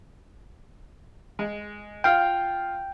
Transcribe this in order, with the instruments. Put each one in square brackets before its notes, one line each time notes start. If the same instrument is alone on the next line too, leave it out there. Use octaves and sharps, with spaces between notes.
[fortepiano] G#3
[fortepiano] F4 F5 [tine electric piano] G5